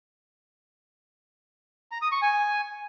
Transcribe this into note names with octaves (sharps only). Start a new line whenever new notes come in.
A#5
D#6
C#6
G#5